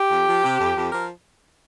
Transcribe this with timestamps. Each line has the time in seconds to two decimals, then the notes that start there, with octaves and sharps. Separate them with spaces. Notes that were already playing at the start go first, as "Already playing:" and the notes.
Already playing: G4
0.10 F2
0.26 F3
0.44 C3
0.60 F2
0.76 F2
0.92 F3 A#4